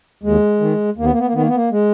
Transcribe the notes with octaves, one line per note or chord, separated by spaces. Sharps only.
D#2 G#3
D#3
D#2 A#3
B3
A#3
B3
A#3
D#3 B3
A#3
B3
A#3
G#3